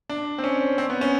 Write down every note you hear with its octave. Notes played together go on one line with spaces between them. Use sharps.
D4
C4
C#4
C4
B3
C#4